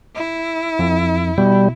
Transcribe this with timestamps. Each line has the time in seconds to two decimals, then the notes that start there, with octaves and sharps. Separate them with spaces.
0.15 E4
0.79 F2
1.38 B2 G3